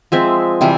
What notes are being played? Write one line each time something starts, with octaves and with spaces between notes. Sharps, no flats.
F3 G#3 C4 E5
C3 E3 G3